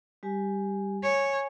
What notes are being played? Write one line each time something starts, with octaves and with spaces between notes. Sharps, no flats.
G3 G4 G#5
C#5 G#5